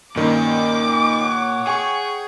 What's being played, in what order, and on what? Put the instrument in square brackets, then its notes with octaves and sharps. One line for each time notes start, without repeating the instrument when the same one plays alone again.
[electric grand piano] G2 D#3 C#4 [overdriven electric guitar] A#2 [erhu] D6
[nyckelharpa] C#5 F#5
[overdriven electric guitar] G#4 [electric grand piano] G5 G#5 C#6